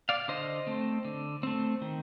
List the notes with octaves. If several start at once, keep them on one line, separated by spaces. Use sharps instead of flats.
D5 F5
D3 C5 D#5
A3 C4
D3
A3 C4
D#3